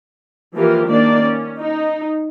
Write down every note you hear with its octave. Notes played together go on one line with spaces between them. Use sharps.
E3 F3 A#3 F4 G4 A#4
D#3 A#3 D4 D5
C#4
D#4